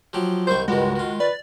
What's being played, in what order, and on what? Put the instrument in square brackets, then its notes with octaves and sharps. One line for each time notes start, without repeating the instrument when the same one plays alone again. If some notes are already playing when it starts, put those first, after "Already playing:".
[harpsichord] F3 F#3 G4
[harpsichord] C2 D#3 C#6 [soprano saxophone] C5 [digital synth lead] G6
[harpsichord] C#2 G2 D#3 [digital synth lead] G#3 [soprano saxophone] F#4
[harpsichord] D#3 F4
[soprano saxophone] B4 [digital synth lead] D5